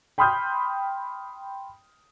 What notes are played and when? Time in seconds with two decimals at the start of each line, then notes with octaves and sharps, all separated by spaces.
0.18 G5 B5 C6 D#6 F6 G6